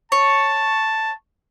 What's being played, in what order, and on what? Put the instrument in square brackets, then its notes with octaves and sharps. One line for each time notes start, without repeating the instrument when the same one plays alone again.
[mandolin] C#5 [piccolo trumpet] A5